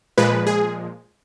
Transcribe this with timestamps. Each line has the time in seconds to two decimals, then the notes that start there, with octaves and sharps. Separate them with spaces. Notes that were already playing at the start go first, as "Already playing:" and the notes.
0.18 A#2 F3 G#3 B4
0.47 G#4